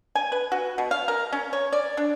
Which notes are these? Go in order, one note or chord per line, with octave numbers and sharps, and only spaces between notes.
G#5
B4
F#4
B2
F5
A#4
C#4
C#5
D5
D4